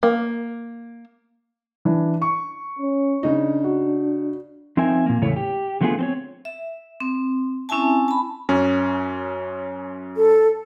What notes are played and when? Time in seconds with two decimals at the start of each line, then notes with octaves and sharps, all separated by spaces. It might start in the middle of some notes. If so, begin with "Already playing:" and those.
0.03 A#3
1.85 E3 D4
2.22 C#6
2.79 C#4
3.23 C#3 D4 D#4
3.64 F#4
4.77 F3 C4 D#4 A#4 E5 G#5
5.06 A#2 A#3
5.22 E2 A2 C#3 A3 E4 C#5
5.36 G4
5.81 D3 F3 A3 B3 F4 G#4
5.99 C4 C5 C#5
6.45 E5
7.00 C4
7.69 C4 C#4 E4 E5 G#5 A5
8.08 A5 B5
8.49 F#2 C#4
10.16 A4